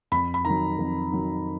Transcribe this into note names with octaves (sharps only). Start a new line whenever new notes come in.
F2 B5
B5
D#3 F#3 A#5
F2
D#3 F#3